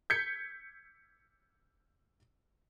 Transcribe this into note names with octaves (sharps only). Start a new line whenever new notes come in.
G6 G#6 B6 C#7